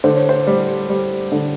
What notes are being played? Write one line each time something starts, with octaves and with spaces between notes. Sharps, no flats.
D3 C5
C#5
C5
G3
G3
D3